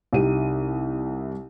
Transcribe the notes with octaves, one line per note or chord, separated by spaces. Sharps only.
C2 C3 D#4 G4 D#7